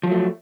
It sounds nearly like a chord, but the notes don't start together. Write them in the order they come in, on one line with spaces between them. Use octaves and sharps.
F3 F#3 A3